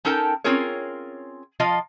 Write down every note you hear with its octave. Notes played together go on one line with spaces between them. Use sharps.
C#4 D#4 A4 A#4 G5 A5
C4 C#4 F4 G#4 A#4 C#5
F3 F4 D#5 F5